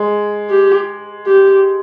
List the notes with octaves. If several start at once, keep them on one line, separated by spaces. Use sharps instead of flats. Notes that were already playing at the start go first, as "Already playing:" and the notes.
Already playing: G#3
G4
G4